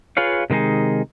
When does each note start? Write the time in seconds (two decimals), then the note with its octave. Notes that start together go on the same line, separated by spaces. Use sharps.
0.17 F4 G#4 B4 C#5 F5
0.50 C3 D#3 G#3 D#4 G#4